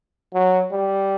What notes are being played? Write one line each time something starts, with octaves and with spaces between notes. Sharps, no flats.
F#3
G3